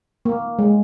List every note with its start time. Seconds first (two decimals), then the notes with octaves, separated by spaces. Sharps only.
0.25 A#3
0.59 G#3